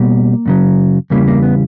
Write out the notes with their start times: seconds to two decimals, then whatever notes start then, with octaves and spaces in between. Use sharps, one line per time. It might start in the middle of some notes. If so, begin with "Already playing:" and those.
Already playing: B2 G3 A#3
0.46 F#2 C#3 F#3
1.10 E2 C#3 E3 G3 A#3
1.28 A#3
1.43 B3